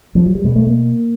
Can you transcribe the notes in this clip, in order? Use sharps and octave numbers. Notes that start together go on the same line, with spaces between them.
F3
F#3
G3
B2 G#3
A3
A#3